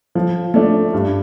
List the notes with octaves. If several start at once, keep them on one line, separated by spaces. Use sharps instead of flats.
F3
A3 D4
G2